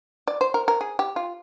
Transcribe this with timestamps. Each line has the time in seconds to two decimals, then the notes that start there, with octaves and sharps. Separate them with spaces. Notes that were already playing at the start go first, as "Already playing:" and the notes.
0.28 D5
0.41 C5
0.54 A#4
0.68 A#4
0.81 G#4
0.99 G4
1.16 F4